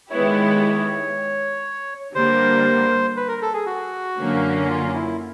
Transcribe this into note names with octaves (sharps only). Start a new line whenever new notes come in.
D#3 G#3 B3 E4 G4 C#5
D3 G3 A#3 C5
B4
A#4
A4
G#4
F#4
F#2 D3 F#3 A#3 C#4
F4
E4